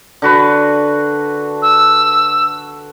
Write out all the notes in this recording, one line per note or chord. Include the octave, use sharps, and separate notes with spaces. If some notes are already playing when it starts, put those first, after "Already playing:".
D3 F#4 B4
E6